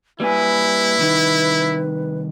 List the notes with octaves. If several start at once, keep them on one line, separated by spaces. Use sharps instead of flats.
G3 A#3 E4 B4 G#5
C2 D#3